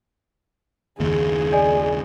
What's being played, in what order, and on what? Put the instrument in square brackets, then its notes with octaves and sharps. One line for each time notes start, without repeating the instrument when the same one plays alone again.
[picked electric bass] F#1 D#2 [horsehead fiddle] G#4
[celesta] D5 D#5 G#5